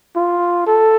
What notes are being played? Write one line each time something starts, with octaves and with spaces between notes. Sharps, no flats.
F4
A4